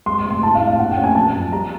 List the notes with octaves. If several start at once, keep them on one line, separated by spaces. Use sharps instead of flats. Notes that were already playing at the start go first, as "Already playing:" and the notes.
G#3 C6
C6
C3
C6
A2 A5
F5
D4
F5
A#2 F#5
G5
C#4
G#5
F3 A5
F#2
G3 A#5